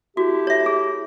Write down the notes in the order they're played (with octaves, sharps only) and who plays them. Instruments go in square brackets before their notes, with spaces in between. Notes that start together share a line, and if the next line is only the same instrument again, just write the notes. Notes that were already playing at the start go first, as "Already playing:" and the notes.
[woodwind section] A3 E4 G4 [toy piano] F#4
[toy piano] C#5 E5
G#4